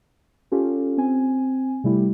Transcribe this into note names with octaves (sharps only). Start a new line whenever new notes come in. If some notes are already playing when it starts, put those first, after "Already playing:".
C#4 F4 G4 A4
C4 G#5
C3 G3 A3 E4 G4